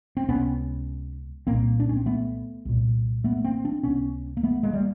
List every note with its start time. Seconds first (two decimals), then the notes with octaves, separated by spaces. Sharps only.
0.17 C4
0.28 C#2 C3 B3 C#4
1.46 C2 A#2 A#3 C4
1.80 D4
1.89 C#4
1.97 C4
2.06 A3 B3
2.65 C2 A#2
3.24 A3 B3
3.44 A#3 C4
3.65 C4 D4
3.83 C#2 C3 B3 C#4
4.37 A#3
4.43 A3 B3
4.63 G#3 A#3
4.73 G3